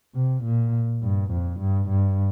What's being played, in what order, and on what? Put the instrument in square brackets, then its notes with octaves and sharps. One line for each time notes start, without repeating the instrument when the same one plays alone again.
[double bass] C3
A#2
G2
F2
G2
G2